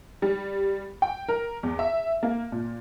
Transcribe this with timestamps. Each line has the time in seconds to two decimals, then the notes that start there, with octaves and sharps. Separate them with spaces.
0.22 G3
1.02 G5
1.29 A#4
1.63 E2
1.79 E5
2.23 A#3
2.52 A#2